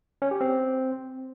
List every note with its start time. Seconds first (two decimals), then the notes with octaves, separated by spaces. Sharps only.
0.22 C#4
0.31 G4
0.41 C4